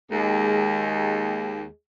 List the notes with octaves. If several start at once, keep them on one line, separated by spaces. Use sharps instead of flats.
D#2 G#3 G#4